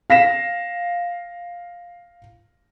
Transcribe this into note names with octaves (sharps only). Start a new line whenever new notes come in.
F5 A#6 B6 E7